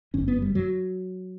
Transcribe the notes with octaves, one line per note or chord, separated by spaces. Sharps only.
G1 F#2 D3 C#4
B3
G3
F#3